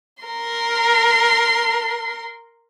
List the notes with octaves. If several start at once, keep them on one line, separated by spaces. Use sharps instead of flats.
A#4 C6